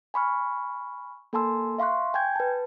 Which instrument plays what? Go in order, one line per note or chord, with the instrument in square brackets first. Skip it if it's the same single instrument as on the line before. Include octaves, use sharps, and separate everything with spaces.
[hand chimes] G#5 B5 C#6 F6
A#3 A4 G#5 A5 C6 E6
E5 F5 C6 C#6 F#6
G5 G#5 G6 G#6
B4 A5